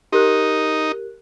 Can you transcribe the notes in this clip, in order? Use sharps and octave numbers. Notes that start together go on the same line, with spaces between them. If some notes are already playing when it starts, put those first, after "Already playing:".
D#4 G4 A#4 F#6